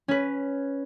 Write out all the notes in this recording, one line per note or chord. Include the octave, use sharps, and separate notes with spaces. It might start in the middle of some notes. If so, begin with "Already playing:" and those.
C#4 B4